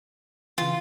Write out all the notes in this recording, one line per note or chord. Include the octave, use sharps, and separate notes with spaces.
C#3 E3 F4